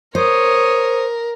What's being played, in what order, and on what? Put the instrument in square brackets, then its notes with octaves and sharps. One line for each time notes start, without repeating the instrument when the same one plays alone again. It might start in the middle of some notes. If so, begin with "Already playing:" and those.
[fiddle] A#4 [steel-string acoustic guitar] C5 [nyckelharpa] C#5 D#6